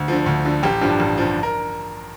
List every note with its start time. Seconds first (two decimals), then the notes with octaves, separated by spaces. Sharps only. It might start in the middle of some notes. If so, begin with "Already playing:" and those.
Already playing: D2
0.08 D3 F3
0.26 D2
0.45 D3 F3
0.63 A1 G4
0.81 G2 D3 F3
1.00 A1
1.18 G2 D3 F3
1.43 A#4